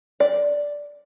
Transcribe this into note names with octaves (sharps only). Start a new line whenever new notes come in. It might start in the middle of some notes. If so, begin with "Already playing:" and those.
D5